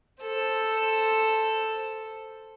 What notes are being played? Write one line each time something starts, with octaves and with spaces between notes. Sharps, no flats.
A4 C5